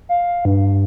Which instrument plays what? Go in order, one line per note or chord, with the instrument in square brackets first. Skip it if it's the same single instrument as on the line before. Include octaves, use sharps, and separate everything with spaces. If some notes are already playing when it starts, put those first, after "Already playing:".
[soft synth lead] F5
G2